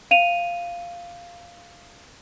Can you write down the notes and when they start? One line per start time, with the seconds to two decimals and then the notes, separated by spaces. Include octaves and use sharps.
0.11 F5 D#7 F7